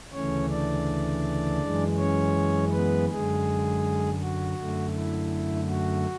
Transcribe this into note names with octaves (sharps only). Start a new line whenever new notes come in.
D2 C#3 E3 A3 C#4 C#5
D4 D5
F#2 E3 G#3
C#4 C#5
B3 B4
F#2 D3 G#3 G#4
F#4
F#2 D3 A3
E4
F#4